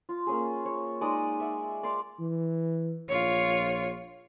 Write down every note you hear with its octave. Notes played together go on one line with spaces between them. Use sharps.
F4
A#3 C#4 G#4
C#5
G#3 D#4 D5 D#6
E5 F#5
D5 F5 C6 D6
E3
A#1 F4 C#5